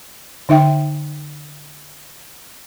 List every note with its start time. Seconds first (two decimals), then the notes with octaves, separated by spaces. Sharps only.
0.49 D3 D#4 E5 G5